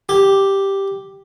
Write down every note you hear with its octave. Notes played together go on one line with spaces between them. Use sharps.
G4